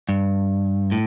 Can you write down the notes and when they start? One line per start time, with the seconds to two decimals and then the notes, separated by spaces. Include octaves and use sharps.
0.09 G2
0.92 A2